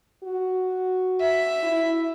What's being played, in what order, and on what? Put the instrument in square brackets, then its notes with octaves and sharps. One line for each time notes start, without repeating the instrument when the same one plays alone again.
[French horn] F#4
[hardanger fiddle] E5
[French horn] E4